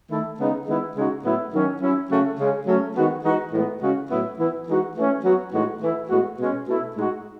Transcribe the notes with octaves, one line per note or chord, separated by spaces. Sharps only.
D#3 A3 E4
C#3 G#3 B3 D#4
D#3 G#3 B3 E4
C#3 G#3 D#4 F#4
A2 F#3 B3 E4
D#3 F#3 C#4
F#3 C#4 E4
C#3 F#3 A3 C#4 F#4
C#3 G#3 C#4
F#3 A3 C#4
D#3 G#3 B3 F#4
E3 G#3 D#4 F#4
A2 E3 G#3 B3
C#3 G#3 C#4 F#4
A2 F#3 B3 E4
E3 B3 E4
E3 G#3 D#4 F#4
E3 A3 C#4
F#3 B3 F#4
A2 E3 G#3 D#4 F#4
E3 A3 E4
A2 G#3 B3 F#4
B2 G#3 C#4
B2 A3 E4
A2 G#3 D#4 F#4